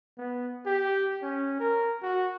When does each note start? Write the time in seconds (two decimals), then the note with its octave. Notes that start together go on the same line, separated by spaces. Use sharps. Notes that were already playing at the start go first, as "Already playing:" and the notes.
0.18 B3
0.66 G4
1.22 C#4
1.60 A#4
2.02 F#4